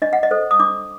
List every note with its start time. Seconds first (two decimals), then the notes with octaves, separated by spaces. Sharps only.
0.02 D4 D#5
0.13 F#5
0.23 D#5
0.31 A4 C5
0.51 D#6
0.60 D4 D6